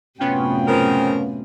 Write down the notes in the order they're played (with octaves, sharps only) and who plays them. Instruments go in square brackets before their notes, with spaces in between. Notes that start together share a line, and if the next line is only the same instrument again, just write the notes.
[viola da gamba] F#2 A2 C3 [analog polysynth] B3 C#4 F4 [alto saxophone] G5
[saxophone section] C#3 F3 A#4